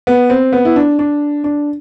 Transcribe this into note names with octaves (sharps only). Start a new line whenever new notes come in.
B3
C4
B3
E4
D4
D4
D4